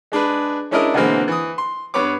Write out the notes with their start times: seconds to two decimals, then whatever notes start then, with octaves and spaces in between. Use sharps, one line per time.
0.12 G#3 D4 G#4 B4
0.71 G#3 C#4 D4 E4 A#4 D#5
0.94 B2 D3 E3 G#3 A#3 C4
1.28 E3 D#6
1.58 C6
1.94 G2 B3 B4 C#5 D6